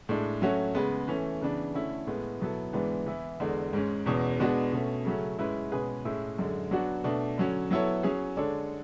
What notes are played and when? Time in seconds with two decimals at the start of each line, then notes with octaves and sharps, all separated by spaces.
0.09 A2 G#3 D4
0.42 F#3 A3 C#4 F#4 C#5
0.75 C#3 G#3 B3
1.08 E3 A3 C#4
1.41 C#3 E3 B3 D4
1.74 D3 A3 C#4 E4
2.07 A2 G#3 B3
2.40 B2 F#3 B3 E4 A4
2.73 G#2 E3 G#3 B3 D4
3.06 E3 B3 E4
3.40 E2 D3 G#3
3.73 G#2 G#3 C#4
4.06 E2 B2 G#3 C#4
4.40 B2 G#3 B3 D4 F#4
4.73 B2 A3 C#4
5.05 C#3 F#3 A3 C#4
5.39 G#2 G#3 C#4 E4 B4
5.72 B2 G#3 C#4 G#4 B4
6.05 A2 G#3 C#4 E4
6.39 F#2 D3 G#3
6.71 F#3 B3 D4 F#4
7.04 B2 A3 D4
7.38 D3 F#3 C#4
7.71 F#3 B3 E4 A4 C#5
8.03 F#3 C#4 G#4 C#5
8.37 D3 G#3 D4 A4 C#5